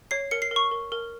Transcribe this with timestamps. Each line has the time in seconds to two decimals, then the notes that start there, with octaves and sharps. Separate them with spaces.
0.11 C#5 C7
0.31 A#4 C#7
0.42 C7
0.51 A#4
0.56 C#6
0.71 A#4
0.92 A#4